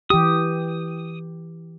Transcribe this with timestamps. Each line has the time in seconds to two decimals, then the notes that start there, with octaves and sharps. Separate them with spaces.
0.10 E3 G4 D#6